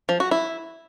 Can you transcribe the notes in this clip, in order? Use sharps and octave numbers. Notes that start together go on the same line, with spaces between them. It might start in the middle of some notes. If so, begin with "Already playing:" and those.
F3
F#4
E4